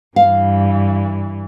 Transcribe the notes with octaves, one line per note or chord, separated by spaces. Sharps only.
G2 E3 F5